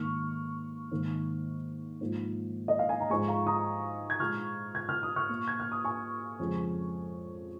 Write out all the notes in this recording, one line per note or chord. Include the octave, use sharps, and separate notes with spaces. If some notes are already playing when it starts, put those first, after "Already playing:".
Already playing: G#2 D#3 A#3 C#6 F6
G#2 D#3 A#3
G#2 F3 A#3
D#5
F5
G#5
A#5
G#2 F3 G#3 G#5 C#6
F5 A#5
A#5 D#6
G#6
A#2 G#3 C#6 F6
G#6
F6
D#6
C#6 F6
A#2 A#3
G#6
F6
D#6
G#5 C#6
F2 C#3 G#3